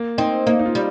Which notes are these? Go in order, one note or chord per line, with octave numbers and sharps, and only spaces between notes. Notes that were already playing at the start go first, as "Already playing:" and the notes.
Already playing: A#3
C4 D#4
A#3 D#4
D#4
F4
G3